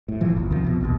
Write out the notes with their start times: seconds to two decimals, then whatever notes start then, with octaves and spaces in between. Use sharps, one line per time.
0.08 A2
0.21 F1 A2 E3 F3
0.37 G1 D2
0.51 C2 D#3 F3
0.64 F2 B2
0.81 A#1 D#2 B2